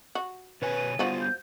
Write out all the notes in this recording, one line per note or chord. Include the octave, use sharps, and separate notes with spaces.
F#4
B2 B4 C#5 G#5
D#7
F3 G3 B3 F4 F#4
G6